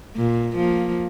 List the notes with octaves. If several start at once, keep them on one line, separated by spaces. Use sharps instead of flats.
A#2
F3 A#3